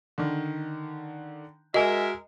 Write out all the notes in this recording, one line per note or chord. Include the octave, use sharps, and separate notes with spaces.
D3 D#3
G#3 F#4 A#4 D#5 E5 G#5